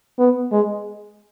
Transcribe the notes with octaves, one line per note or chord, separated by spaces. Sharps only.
B3
G#3